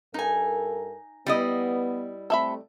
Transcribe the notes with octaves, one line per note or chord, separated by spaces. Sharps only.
G2 D#4 A4 A#4 G#5
G3 B3 E4 D#5
C3 A3 A4 E5 B5